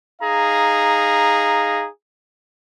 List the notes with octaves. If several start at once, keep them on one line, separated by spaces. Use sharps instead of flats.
D#4 G#4 F5 A#5